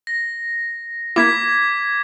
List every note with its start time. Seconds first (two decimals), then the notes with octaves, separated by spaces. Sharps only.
0.07 A#6
1.16 A#3 E4 D6 G#6 B6